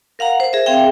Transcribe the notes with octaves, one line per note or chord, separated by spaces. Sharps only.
A#4 F5 F#5 A#5
C5
G#4 A#4 E5
C4 G#4 E5 F5 G5